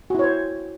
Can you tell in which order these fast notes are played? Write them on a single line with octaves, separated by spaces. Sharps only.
F#4 E4 C#5 C5